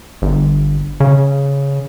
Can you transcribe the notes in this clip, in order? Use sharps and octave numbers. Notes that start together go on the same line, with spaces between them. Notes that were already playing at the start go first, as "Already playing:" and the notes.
G1
C#3